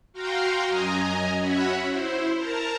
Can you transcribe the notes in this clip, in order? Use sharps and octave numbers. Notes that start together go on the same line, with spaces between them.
F#4 F5 G5 A#5 C6
F#2 D#5 G#5 A#5
C#4 F#4 C#5 E5 F#5 B5
E4 C5
A#4 A5 A#5